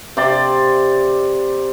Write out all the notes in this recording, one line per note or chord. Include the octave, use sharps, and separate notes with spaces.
C3 C5 D5 C6